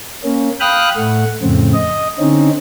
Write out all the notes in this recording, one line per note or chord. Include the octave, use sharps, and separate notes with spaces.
A#3 C#4
F5 G5 B5 D#6 F6 F#6
A2 A3 F#5
F2 A2 C#3 C4
D#5
D3 C4 C#4 D#4